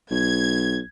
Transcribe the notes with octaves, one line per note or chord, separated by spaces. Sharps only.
B1 G#6